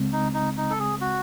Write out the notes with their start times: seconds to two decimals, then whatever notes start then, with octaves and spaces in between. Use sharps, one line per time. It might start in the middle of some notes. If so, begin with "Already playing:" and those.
Already playing: C#2 C#3 G#3 C4
0.13 D#4
0.34 D#4
0.57 D#4
0.70 A4
0.80 G#4
1.01 F#4